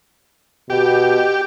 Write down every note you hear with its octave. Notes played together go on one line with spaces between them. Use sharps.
B2 G4